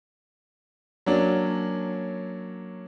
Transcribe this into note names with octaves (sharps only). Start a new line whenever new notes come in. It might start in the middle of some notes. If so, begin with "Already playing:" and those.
F#3 A#3 C#4 D4